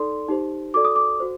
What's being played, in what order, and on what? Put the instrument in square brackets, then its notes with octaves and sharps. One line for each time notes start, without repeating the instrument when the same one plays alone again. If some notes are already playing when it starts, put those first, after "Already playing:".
Already playing: [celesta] D#4 A4 D5 C6
D#4 G4 C5
F#4 A4 D5 D6
D#6
D6
F#4 C5